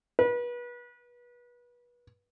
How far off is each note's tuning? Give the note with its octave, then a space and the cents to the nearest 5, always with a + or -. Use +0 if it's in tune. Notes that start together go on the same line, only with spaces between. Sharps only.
B4 -30